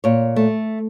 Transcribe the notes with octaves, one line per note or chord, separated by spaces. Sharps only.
A#2 C#5
A3